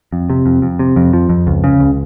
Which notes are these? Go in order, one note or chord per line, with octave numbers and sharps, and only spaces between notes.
F2
C3
F2
F2
C3
F2
F3
F2
C#2
C#3
C#2